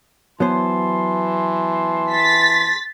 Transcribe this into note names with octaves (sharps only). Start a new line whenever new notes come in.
E3 F#3 B3 C5 A5 C6
A6 B6